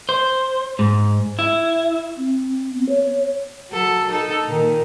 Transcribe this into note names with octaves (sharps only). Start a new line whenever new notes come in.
C5
G#2
E4
C4
B3
C#5
F#3 A4
D#4 A4
A#2 D#3